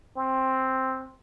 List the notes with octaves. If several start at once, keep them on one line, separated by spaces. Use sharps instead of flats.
C4